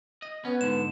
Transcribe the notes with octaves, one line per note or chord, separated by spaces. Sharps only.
D#5
B3 C#4 B4
G#2 D3 E7